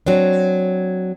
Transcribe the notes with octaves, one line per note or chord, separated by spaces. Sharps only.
F#3 C4 D4